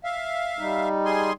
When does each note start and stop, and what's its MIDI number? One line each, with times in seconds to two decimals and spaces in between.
0.04 0.89 76
0.04 0.89 77
0.59 1.31 55
0.59 1.31 63
1.05 1.33 68
1.05 1.33 80
1.05 1.33 84